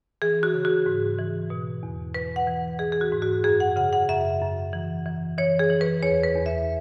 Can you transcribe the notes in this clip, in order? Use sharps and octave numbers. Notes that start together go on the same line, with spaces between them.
E3 G#4
F#4
C#3
F#4
G#2
E3
B2
E2
E3 B4
F#5
E3
E3 G#4
G#4
F#4
G#2
F#4
F#2 G#4
F#5
C#3 F#5
F#5
F#2 E5
F#2
E3
E3
E3 C#5
G#4
E3
B4
E2 C#5
B4
E2
E5